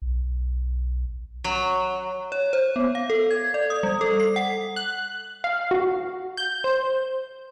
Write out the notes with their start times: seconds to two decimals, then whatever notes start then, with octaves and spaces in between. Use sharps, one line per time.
0.02 B1
1.44 F#3
2.32 C#5
2.53 C5
2.76 B3
2.95 F5
3.10 A4
3.31 G#6
3.54 D5
3.70 D#6
3.83 G3
4.01 A4
4.20 C7
4.36 F#5
4.76 F#6
5.44 F5
5.71 F#4
6.37 G6
6.64 C5